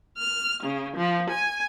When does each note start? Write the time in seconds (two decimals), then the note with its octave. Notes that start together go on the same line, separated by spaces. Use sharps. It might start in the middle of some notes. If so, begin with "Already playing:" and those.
0.18 F6
0.62 C#3
0.96 F3
1.30 G#5